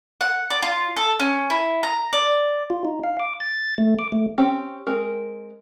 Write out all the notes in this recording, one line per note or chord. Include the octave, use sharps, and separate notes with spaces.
F#5
D5
F4
A4
C#4
E4
A#5
D5
F4
D#4
F5
D6
A6
A3
D6
A3
C4 C#4 G4
G#3 C4 A#4